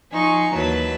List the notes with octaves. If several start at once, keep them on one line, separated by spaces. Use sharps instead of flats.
F3 D#4 G#5 C#6
D#2 E3 F#3 B4 A5